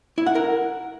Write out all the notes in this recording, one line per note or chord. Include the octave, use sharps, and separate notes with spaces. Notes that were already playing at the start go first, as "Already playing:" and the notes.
E4
F#5
A#4